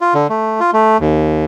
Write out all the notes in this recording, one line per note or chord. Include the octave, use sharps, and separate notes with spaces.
F4
D3
A3
F4
A3
D#2